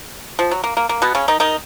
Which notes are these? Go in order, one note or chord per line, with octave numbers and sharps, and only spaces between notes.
F3
F#3
A#3
A#3
A#3
B2 B3
C#3 C#4
D#3 D#4
D#3 D#4